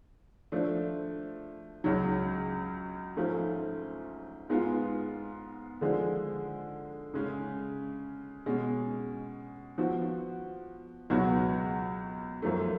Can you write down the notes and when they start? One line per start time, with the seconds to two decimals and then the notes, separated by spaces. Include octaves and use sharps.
0.52 F3 A3 D4
1.84 C#2 C#3 F#3
3.17 G#2 F3 A3 C#4
4.49 G#2 G#3 B3 F4
5.81 D3 F3 G#3 D4 G#4
7.14 C#3 G#3 C#4
8.46 B2 G#3 C#4
9.78 F3 B3 F#4
11.10 C#2 B2 F#3 B3 F#4
12.42 F#2 F3 A3